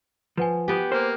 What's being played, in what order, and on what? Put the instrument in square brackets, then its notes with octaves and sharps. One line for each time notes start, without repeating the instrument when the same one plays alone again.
[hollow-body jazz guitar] F3 [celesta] B4 F#5 G#5
[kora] B3 G4
[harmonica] A#3 [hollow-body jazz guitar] C5